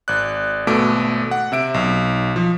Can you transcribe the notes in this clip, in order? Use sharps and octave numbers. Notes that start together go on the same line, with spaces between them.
G#1 D5 F#6
G#1 B2 A3 D6 D7
F#5
C3 E5 D7
B1
F3